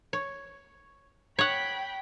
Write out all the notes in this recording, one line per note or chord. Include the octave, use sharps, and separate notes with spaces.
C#5
C#5 F#5 G5 B5